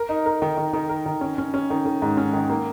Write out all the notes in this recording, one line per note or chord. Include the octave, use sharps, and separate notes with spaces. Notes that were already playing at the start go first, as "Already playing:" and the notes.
Already playing: A#4
D#4
A#4
D#3
D#3
D#3
A#4
D#3
C#4
C#4
C#4
D#3
D#3
G#2
C#4
D#3
A#3